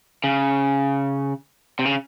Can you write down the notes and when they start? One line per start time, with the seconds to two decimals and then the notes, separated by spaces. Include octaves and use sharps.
0.24 C#3
1.79 C3
1.85 C#3